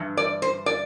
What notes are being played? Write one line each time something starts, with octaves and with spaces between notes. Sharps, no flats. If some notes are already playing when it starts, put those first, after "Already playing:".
Already playing: G2 E3
D5
C5
D5